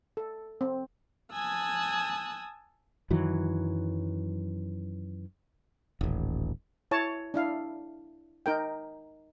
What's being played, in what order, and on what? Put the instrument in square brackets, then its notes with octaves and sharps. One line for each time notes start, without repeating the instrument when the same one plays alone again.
[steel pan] A4
C4
[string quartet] G#5 A5 D#6 E6 F#6 G#6
[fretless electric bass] F#2 D#3 E3 F#3
[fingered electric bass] D#1 A1
[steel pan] E4 C#5 A5
D4 E4 F5
D#4 A#4 G5